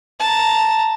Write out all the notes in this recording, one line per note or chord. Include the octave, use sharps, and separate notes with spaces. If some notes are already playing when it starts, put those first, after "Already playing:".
A5 A#5